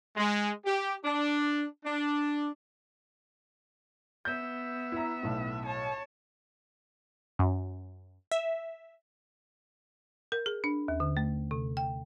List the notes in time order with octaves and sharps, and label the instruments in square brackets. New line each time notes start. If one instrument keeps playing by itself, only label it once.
[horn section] G#3
G4
D4
D4
[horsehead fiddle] B3 E5 [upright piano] G6
[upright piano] E4 A#5
B1 A2
[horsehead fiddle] C#5 A5
[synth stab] F#2
E5
[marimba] A#4
G#4
D4
D#2
D3
A3
C3
G5